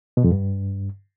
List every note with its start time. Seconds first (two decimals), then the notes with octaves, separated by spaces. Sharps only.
0.17 B2
0.24 F2
0.31 G2